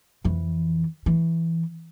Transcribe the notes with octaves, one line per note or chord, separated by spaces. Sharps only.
F2 E3
E3